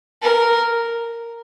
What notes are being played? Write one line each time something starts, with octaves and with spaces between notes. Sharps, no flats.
A#4